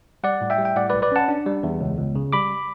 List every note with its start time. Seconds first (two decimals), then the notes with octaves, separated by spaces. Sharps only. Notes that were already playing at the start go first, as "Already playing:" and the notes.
0.24 G3 D5 F#5
0.41 A2
0.50 E5 G5
0.58 G3
0.65 G5
0.76 A2 D5 F#5
0.90 B1 B4 D5
1.02 B4 D5
1.12 C#4 F#5 A5
1.28 D4
1.46 G3
1.63 E2
1.81 C#2
1.97 C#2
2.15 C#3
2.33 G3 B5 D6